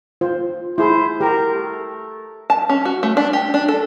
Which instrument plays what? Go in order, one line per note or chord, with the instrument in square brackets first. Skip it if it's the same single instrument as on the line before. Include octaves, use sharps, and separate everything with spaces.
[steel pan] F4 C5
[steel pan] E4 G#4 [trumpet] C5
[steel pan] G4 A#5 [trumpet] A#4
[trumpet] A3
[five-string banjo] A5
C#4
F#4
A3
D4
G4
D4
A4